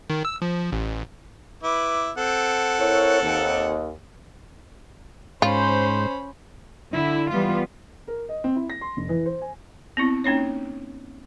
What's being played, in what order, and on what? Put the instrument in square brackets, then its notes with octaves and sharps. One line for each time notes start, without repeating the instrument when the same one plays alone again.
[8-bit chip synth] D#3
E6
F3
A1
[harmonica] E4 B4 D6
C4 A4 F#5
[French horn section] E4 A#4 C#5
D#2
[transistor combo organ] G#2 [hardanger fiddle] C#4 B5 [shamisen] F4 [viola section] C5
[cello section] D3 E4
E3 G3 B3 F4
[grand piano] A#4
D#5
C4
E4
A#6
C6
F1
E3
C5
G#5
[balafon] B3 C4 E4
A#3 C#4 D#4 C#5